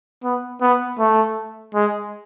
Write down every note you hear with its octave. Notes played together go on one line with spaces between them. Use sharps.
B3
B3
A3
G#3